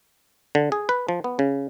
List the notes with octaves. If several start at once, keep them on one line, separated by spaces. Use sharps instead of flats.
D3
G#4
B4
F3
B3
C#3